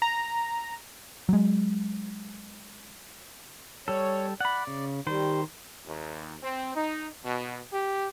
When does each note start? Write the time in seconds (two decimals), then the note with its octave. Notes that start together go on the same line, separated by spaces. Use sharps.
0.02 A#5
1.29 F#3 G#3
3.88 G3 A4 C#5
4.41 D5 F#5 B5
4.67 C#3
5.07 D#3 G3 C5
5.87 D#2
6.42 C4
6.75 D#4
7.24 B2
7.72 G4